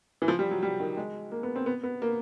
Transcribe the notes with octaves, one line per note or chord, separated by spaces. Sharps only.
E3
F3
G3
F#3
G3
D#3
G#3
A#3
B3
C4
B3
B3
A#3